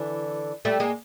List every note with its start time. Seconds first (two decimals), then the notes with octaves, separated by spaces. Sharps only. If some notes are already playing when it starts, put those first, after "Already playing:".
Already playing: D3 E3
0.65 G3 A3
0.80 G#3 A#3